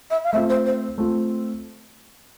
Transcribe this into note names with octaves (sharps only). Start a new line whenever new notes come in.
E5
F5
A3 C4 F4 E5
C5
C5
A3 C4 F4